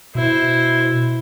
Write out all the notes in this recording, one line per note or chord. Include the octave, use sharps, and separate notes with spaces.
B2 E4 C5